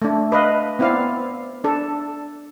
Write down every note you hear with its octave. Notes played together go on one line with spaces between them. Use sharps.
A3 D4
B4 D#5 F5
B3 C4 E4 D5 F5
D4 A4